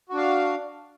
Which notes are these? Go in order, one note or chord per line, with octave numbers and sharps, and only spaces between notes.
D4 F#4 F5